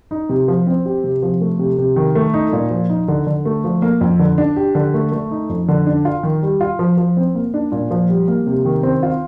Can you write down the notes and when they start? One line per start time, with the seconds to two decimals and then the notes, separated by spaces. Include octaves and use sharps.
0.11 D#4
0.29 C3
0.48 F3
0.67 C4
0.85 G4
1.04 C3
1.22 F3
1.41 A3
1.59 C3
1.78 C3
1.96 D#3
2.15 A3
2.34 D#4
2.53 A#2
2.71 F3
2.89 D#4
3.08 D3
3.27 D3
3.45 A3
3.64 F3
3.82 A#3
4.01 F2
4.19 D3
4.38 D4
4.56 G4
4.75 D3
4.94 A3
5.12 A3
5.31 D#4
5.49 F2
5.68 D3
5.87 D4
6.05 F4
6.23 D#3
6.43 G3
6.61 F4
6.79 F3
6.97 F3
7.17 C4
7.35 A#3
7.54 D4
7.72 A#2
7.91 F3
8.09 G3
8.28 A#3
8.47 C3
8.65 D#3
8.83 C4
9.03 F4